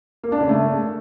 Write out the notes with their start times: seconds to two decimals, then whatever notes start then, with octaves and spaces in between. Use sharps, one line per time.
0.23 A#3
0.32 D4
0.41 C#3
0.49 A3